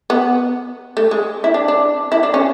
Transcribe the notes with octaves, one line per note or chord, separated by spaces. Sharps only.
B3
A3
G#3
E4
D4
D4
E4
D4
C#4